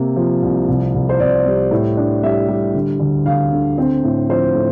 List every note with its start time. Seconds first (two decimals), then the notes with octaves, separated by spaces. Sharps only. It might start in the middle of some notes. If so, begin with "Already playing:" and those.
Already playing: C3 A#3
0.16 F3
0.42 C2
0.68 C2
0.94 C2
1.09 C5
1.19 C2 D5
1.46 G3
1.71 A2
1.97 D4
2.23 G3 E5
2.49 G3
2.74 D3
3.00 D2
3.26 D2 F5
3.52 D3
3.78 C4
4.03 A2
4.29 F3 C5
4.55 A2